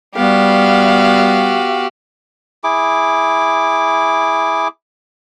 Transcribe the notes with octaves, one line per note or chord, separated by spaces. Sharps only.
G3 B3 F#4 G4 F5
E4 G#4 D6